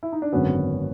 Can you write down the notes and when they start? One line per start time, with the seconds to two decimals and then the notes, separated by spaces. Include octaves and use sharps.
0.03 E4
0.12 D#4
0.22 D4
0.33 G#1 F#2 D3 F#3 B3 C#4